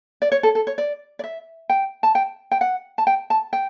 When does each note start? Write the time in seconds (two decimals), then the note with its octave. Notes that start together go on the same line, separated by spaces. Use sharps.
0.22 D5
0.32 C#5
0.43 A4
0.55 A4
0.67 C#5
0.78 D5
1.19 D5
1.24 E5
1.70 G5
2.03 A5
2.15 G5
2.52 G5
2.61 F#5
2.98 A5
3.07 G5
3.30 A5
3.53 G5